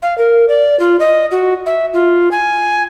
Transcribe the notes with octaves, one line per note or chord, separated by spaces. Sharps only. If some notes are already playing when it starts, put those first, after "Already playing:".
F5
A#4
D5
F4
D#5
F#4
E5
F4
G#5